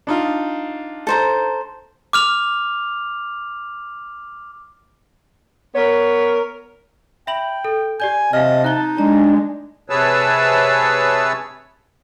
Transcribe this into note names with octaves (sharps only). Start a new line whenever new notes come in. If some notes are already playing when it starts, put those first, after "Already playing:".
D4 D#4 F4
A4 C5 A#5
D6 F6 F7
B3 A#4 C#5
E5 G5 B5 F#7
A4
G4 D5 G#5 G6
C3 D#5 F5 A5 F6
D#4 F#6 G7
G#3 D4 A#5
C3 G#4 B4 C#5 A5 E6